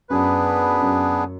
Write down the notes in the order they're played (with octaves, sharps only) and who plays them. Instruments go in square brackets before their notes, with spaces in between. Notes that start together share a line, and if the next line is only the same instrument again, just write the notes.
[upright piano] F#2 [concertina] B3 D4 G#4 B4
[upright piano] F#2